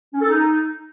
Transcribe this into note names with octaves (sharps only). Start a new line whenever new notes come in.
C#4
A4
D#4